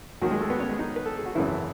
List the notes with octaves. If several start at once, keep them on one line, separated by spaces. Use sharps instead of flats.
D#2 D#3 F#3 F#4
G#3 G#4
A3 A4
B3 B4
C#4 C#5
G#3 G#4
D#4
B4
A4
G#4
F#4
G#1 F#2 C#3 E3 E4